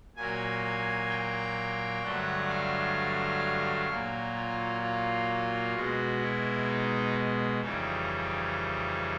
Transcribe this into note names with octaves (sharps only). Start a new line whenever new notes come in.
A#2 F#3 A#3 G#5
G5
G2 D3 F#3 A3 F#5
F5
A#2 F#3 A#3
F4
F4
B2 G#3 F#4
E4
D#4
F2 C#3 E3 G3 D#4